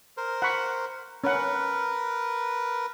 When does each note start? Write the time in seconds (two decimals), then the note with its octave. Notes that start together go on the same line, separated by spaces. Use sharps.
0.17 A#4 C5
0.42 F#5 B5 C#6
1.24 C#4 A#4 B4 F#5